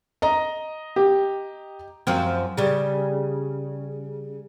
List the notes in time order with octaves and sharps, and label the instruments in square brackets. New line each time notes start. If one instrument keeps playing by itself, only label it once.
[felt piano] D#5 A#5
[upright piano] G4
[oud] F#2 F3 C4
C#3 G3